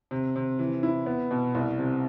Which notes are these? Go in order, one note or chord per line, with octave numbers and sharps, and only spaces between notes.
C3
C3
E3
E4
B3
B2
C2
C3